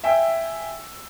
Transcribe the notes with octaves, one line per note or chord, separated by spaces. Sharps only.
E5 G5 G#5 E6